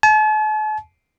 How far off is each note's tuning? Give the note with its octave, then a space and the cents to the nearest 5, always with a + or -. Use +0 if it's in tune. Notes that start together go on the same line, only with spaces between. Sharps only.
A5 -45